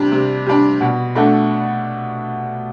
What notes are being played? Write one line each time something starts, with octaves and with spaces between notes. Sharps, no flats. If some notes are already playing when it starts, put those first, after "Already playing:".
Already playing: C3 G3 D4
C3
G3 D4
B2
A3 D4 F#4 A4